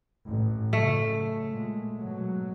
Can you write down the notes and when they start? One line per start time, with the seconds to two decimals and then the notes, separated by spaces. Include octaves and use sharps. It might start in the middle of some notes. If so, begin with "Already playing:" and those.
0.25 A1
0.73 F#2 C#3 A3
1.49 A#2 G#3
1.96 G#2 B2 F#3